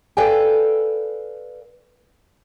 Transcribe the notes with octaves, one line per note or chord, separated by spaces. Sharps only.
A4 B4 D5 F5 G5 G#5